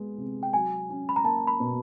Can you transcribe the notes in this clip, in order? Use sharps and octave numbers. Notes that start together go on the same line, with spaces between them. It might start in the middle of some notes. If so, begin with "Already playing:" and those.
Already playing: G#3 B3
C3
G5
F#3 G#5
C#4
B5
A#5
A#3 A5
B5
B2